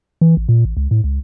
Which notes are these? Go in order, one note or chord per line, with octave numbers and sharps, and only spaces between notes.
E3
A1
A#2
A1
C#2
A2
C#2